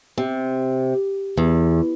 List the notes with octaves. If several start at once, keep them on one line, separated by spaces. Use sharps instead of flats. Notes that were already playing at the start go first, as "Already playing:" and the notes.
C3
E2